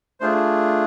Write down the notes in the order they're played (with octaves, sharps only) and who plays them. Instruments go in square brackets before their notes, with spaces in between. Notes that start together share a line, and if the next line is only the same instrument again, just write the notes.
[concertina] A3 D4 F4 G#4 C5